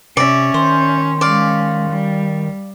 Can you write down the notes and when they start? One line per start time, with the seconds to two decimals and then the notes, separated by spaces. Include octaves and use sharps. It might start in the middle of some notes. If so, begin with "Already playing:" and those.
0.17 C3 C#4 D5 E5
0.54 D#3 C5
1.21 G#3 C#4 D5 F5
1.90 G3